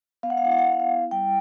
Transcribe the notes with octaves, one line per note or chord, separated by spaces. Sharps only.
B3 F5
F#5
F5
E4 F#5
F5
F#5
B3 F5
F#5
F5
E4
G3 G5